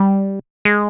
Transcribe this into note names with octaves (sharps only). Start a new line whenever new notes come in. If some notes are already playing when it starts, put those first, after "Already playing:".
Already playing: G3
G#3